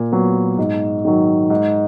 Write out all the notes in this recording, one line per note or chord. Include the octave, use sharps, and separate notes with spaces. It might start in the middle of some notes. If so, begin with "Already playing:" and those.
Already playing: A#2
F#3 B3
G#2
D#3 F#3
G#2